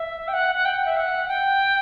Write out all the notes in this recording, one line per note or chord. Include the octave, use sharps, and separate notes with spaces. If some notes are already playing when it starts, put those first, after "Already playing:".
Already playing: E5
G5
F#5
F#5
G5
E5
F#5
G5